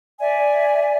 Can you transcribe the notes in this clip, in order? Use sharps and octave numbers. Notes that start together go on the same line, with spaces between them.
D5 E5 G#5